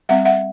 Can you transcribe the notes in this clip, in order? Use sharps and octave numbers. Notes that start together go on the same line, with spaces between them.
G3 C4 E5 F#5
E5 F#5